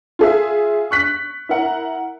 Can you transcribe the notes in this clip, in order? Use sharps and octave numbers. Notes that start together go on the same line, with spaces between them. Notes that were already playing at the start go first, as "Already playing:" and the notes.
F4 G#4 E5
C#6 F#6 B6
E4 A#4 F#5